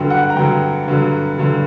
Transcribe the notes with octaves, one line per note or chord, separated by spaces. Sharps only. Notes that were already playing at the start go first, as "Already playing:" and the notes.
Already playing: G2 D3 F#3 G5
F#5
A#5
G2 D3 F#3 G5
G2 D3 F#3
G2 D3 F#3